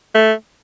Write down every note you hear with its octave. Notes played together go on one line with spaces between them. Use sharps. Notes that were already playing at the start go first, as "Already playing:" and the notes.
A3